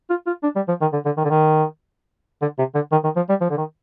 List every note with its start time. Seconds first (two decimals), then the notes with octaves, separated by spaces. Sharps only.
0.10 F4
0.27 F4
0.43 D4
0.56 G3
0.68 F3
0.81 D#3
0.93 D3
1.05 D3
1.17 D#3
1.25 D3
1.30 D#3
2.42 D3
2.58 C3
2.75 D3
2.92 D#3
3.04 D#3
3.16 F3
3.29 G3
3.41 F3
3.50 D3
3.58 D#3